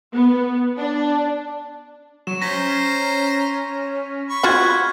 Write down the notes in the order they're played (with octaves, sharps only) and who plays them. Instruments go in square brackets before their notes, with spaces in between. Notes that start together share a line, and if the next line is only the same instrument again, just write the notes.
[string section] B3
D4
[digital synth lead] F#3 [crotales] C#6 E7
[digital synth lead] C#4 [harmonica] C5 A#5 [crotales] A#6 B6
[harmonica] B5 C#6
[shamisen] F4 F#4 F#5 [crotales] F6 F#6 G#6